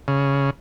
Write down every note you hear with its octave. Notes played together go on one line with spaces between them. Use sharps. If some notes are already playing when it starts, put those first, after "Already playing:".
C#3